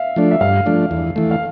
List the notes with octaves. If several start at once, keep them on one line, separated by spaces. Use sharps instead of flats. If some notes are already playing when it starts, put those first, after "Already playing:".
Already playing: E5 F5
F3 A3 D4
E5
G2 F5
F3 A3 D4
E2
E3 A3
F5